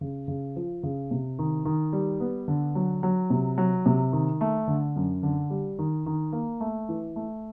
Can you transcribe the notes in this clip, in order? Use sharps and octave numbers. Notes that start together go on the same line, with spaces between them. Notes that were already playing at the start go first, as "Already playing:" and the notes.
C#3
C#3
F3
C#3
C3
D#3
D#3
G3
B3
D3
F#3
F#3
C3
F#3
C3
D#3
A3
D3
F#2
D3
G3
D#3
D#3
A#3
A3
E3
A3